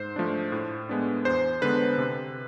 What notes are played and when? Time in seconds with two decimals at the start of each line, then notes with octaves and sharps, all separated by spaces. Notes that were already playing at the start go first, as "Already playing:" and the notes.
Already playing: G#2 C5
0.16 F3 A3 D4
0.52 A2
0.89 G#3 B3 D4
1.25 E2 C5
1.62 D3 G#3 B3 D4 B4
1.98 C3